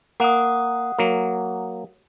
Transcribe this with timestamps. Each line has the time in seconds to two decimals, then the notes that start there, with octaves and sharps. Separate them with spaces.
0.20 A#3 F#5 D#6
0.99 F#3 A#3